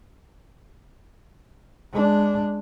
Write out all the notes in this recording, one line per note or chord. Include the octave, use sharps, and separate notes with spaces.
G#3 D4